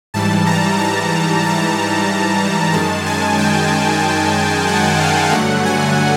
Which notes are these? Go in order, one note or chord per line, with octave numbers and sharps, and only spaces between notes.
G#2 E3 G3 A5
A#5
A5
A5
F#2 D#3 G#3 A5
G#5
G5
F#5
F5
G2 D3 F#3 A3 F#5
G#5